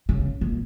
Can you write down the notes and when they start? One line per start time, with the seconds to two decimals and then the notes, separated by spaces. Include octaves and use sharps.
0.09 C#3
0.41 A#2